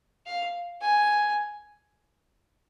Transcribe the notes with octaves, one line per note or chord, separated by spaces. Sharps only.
F5
G#5